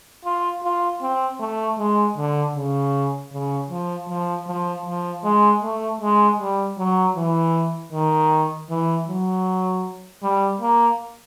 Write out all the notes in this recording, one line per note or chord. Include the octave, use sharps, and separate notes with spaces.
F4
F4
C4
A3
G#3
D3
C#3
C#3
F3
F3
F3
F3
G#3
A3
G#3
G3
F#3
E3
D#3
E3
F#3
G3
A#3